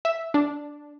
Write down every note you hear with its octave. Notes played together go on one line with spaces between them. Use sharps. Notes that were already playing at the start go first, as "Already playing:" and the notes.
E5
D4